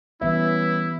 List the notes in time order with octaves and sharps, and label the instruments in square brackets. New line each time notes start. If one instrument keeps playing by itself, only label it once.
[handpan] E3 B3 E5 [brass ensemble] G3 C#4 B4 [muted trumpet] E4